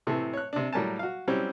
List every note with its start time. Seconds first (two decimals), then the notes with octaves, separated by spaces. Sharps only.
0.07 A2 C3 E3 A3
0.34 C#5 F#6
0.53 C3 D4
0.73 A2 F#3 G3 A#4 G#5 A5
0.99 F#4 F5
1.27 F#3 G3 C4 C#4 E4 G4